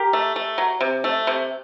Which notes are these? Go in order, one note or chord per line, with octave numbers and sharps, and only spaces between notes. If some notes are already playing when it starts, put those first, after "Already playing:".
Already playing: G4 A#4
A3
A3
F#3
C3
A3
C3